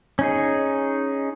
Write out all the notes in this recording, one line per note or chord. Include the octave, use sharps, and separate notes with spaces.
C#4 D#4 G#4